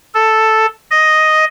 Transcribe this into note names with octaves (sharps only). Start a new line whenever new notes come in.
A4
D#5